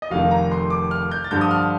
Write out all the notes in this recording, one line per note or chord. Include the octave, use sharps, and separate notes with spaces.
D#5
F1 F2 D#3 F5
A#5
C6
D6
F6
G6
A6
G2 D3 F3 G6
D#6
F6